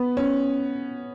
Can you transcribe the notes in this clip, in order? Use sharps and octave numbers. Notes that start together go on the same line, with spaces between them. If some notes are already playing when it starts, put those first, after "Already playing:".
Already playing: B3
C#4